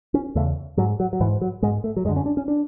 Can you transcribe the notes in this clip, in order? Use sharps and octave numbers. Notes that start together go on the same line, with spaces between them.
C#4
E2 C#3 A3
G#2 F#3
F#3
F#3
G#2 E3
F#3
G#2 G#3
A3
F#3
F#2 D3 G#3
C#4
D4
C#4
D4